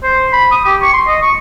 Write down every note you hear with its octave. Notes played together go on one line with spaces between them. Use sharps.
C5
B5
D#6
G4
C#6
C6
D#5
C#6